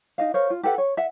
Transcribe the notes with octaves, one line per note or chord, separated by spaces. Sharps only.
D#4 D#5 F5
A#4 C5 C#5 F5
F4
G4 A4 B4 F#5
C#5
E5 F#5